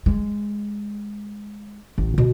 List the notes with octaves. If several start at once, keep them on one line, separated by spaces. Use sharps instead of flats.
G#3
A1
B2